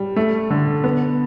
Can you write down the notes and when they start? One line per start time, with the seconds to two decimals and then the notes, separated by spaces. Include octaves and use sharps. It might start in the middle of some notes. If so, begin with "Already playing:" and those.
Already playing: G3
0.16 A3
0.50 D3
0.84 B3